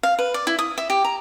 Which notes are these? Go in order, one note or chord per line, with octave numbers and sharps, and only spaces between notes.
F5
B4
D5
E4
D#6
E5
G4
A#5